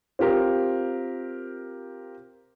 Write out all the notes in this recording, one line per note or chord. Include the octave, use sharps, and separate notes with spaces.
C4 F4 G4 A#4